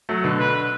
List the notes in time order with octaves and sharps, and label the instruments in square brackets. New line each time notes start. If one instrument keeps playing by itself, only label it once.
[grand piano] F#3 A3
B2 D3
[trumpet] B4